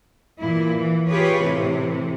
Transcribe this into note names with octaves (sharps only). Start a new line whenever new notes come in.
A#2 E3 E4
E3
F4 G4 G#4 B4 C#5
A2 C3 E3